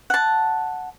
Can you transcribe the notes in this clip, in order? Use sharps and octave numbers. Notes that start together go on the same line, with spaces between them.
F#5 A5